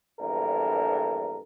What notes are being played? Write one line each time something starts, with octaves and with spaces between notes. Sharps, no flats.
A#1 E2 G2 A4 A#4